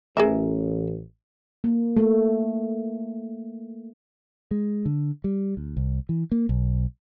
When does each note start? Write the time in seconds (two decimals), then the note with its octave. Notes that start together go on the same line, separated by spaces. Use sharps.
0.17 A1 G#4 A#4 E5
1.64 A#3
1.97 A3
4.51 G#3
4.85 D3
5.24 G3
5.57 D2
5.77 C2
6.09 E3
6.32 A#3
6.49 B1